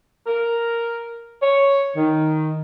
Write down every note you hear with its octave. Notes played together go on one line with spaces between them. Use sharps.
A#4
C#5
D#3